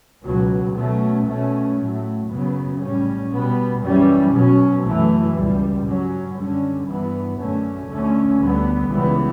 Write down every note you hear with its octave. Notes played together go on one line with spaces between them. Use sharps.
C#2 B2 F#3
B2 F#3 A3 C#4
B2 A3 C#4
A2 F#3 A3
F#2 C#3 F#3 B3
A2 G3 C#4
B2 G3 B3
F#2 E3 G3 C#4
B2 F#3 C#4
F#2 E3 A3
C#2 B2 G3
G2 F#3 C#4
F#2 D3 G3 C#4
G2 E3 B3
F#2 D3 A3 C#4
D2 D3 A3 C#4
D2 D3 G3 B3
C#2 C#3 E3 G3 B3